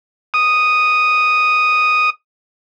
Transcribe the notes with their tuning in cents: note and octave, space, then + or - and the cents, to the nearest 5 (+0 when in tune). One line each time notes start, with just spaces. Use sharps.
D#6 -5